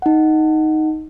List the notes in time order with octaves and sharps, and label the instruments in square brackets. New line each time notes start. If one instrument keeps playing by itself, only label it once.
[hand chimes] D#4 F#5